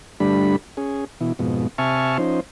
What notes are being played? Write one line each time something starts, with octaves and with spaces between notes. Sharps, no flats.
G2 D3 G3 A3 D4 B5
C#4 G#4
B2 E3
F2 G#2 B2
C3 E5 G#5 A5 C#6 F6
F3 C#4 D#4 C5